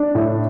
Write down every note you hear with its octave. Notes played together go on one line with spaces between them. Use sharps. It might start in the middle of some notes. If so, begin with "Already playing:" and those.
Already playing: D4
A2